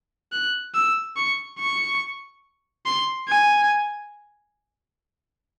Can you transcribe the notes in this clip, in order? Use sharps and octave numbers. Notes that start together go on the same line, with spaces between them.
F#6
E6
C#6
C#6
C6
G#5